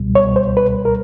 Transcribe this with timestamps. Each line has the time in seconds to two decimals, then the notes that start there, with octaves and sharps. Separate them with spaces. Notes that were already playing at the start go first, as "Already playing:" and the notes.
Already playing: C#2 B2 G3
0.15 C#5
0.36 C5
0.57 B4
0.85 A#4